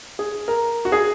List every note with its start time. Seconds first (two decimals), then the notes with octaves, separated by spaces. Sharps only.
0.19 G#4
0.48 A#4
0.85 F#4
0.92 G#4